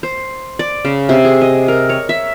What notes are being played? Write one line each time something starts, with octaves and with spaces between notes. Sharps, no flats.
C5
D5
C#3
C3
G#4
D#5
A#4
C#5
E5